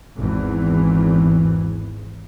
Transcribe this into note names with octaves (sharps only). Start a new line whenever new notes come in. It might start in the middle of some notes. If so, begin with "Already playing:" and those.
G#1 E2 E3